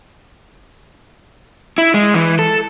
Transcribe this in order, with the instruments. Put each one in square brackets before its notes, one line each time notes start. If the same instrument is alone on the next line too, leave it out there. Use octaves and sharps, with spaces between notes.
[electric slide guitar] E4
G#3
E3
A4